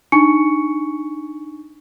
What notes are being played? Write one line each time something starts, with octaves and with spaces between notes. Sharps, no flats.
D4 D#4 G#5 C#6 C#7